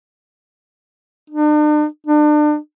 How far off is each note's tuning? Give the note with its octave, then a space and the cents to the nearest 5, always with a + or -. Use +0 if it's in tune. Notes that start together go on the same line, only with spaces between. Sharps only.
D4 +45
D4 +35